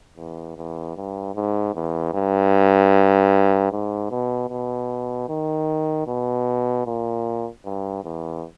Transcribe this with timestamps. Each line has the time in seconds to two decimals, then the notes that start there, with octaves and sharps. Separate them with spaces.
0.17 E2
0.57 E2
0.96 G2
1.35 G#2
1.75 E2
2.14 G2
3.72 G#2
4.11 B2
4.50 B2
5.29 D#3
6.07 B2
6.86 A#2
7.66 G2
8.04 E2